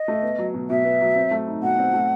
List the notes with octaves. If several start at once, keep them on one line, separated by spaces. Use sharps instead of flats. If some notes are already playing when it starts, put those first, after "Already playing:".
Already playing: D#5
A3
B3
F#3
B2
B2 E5
B3
F#3
C4
A3
D#4
B2 F#5
C4
A3